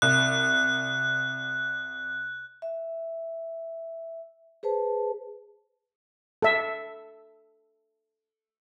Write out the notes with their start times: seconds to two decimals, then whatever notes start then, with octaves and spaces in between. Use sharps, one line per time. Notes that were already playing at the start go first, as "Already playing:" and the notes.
0.02 C2 F#6
2.62 E5
4.63 G#4 B4 C5 A5
6.42 A4 E5